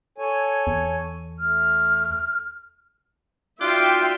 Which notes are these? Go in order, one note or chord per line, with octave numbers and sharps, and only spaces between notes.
A4 C#5 G#5
E2
A3 F6
D#4 F4 F#4 D5 E5 G5 C6 D6